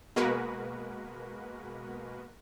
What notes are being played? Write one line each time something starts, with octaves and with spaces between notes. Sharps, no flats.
B2 G#3 A#3 F#4 A#4 B4